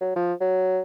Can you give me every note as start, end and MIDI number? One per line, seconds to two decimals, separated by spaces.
0.01 0.12 54
0.16 0.34 53
0.41 0.81 54